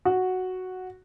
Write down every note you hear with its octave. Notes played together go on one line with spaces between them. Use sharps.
F#4